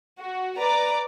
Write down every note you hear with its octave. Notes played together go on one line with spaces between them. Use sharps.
F#4
B4 D5 A#5 D6